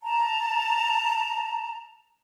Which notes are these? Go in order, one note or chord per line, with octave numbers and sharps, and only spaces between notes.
A5 A#5